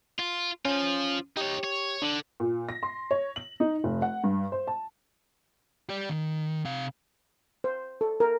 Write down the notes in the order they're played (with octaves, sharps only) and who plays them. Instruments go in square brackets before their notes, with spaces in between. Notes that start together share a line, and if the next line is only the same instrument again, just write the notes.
[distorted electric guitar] F4
[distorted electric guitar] F3 F4 [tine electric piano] C#4
[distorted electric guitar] D#4 C#5 [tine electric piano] G4
[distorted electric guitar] C#5
[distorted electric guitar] D3 [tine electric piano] D4
[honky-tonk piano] A#2
A#6
C6
C#5
F#7
D#4
F1
F#5
G2
C5
A5
[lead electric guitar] G4 D5
D#3
C3 F5
[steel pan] C5
A4
A#4